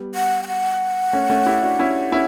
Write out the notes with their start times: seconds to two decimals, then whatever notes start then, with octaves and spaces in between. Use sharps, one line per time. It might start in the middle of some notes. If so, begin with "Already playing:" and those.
Already playing: G3 B3
0.15 F#5
0.43 G5
0.47 F#5
1.13 A3 C#4
1.30 A3 C#4
1.46 E4 G4
1.62 D4 F#4
1.79 C#4 E4
2.12 C#4 E4